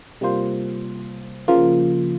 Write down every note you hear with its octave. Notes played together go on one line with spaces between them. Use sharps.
C3 G3 A#3 F4 C5
C#3 F3 A#3 F4